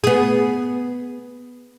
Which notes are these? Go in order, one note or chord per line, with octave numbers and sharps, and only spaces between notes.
B3 G#4